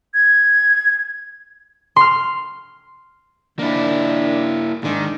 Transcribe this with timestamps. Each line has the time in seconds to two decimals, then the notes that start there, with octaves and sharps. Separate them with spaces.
0.14 G#6
1.96 C6 F6
3.59 D#3 F3 A#3 D4 E4
4.84 G#2 D#3 D4